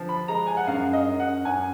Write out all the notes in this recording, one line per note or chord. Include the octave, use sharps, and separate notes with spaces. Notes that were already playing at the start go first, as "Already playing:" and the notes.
Already playing: D3 F3
B5
G#3 A#5
G#5
F#5
F#2 F5
D#5
F#2
F#5
F#2 G#5